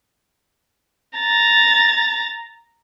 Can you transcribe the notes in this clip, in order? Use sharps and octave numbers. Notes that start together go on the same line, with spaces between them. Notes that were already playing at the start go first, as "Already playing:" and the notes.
A#5 A6